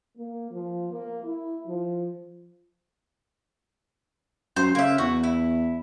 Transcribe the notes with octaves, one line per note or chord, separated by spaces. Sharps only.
A#3
F3
A#3
E4
F3
F#2 C5 G6
C#3 A#3 E5
E2 F#4
E4